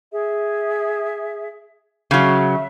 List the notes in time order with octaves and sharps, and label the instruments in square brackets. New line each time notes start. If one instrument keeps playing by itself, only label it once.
[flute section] G#4 E5
[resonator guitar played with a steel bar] C#3 F#3 [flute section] E5